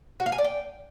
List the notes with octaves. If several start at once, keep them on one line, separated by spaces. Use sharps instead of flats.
F#4
F5
G#5
D5
G5